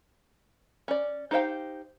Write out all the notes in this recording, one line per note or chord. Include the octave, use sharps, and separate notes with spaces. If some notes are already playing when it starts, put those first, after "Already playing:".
C#4 D5
D#4 G4 C5 F5 G5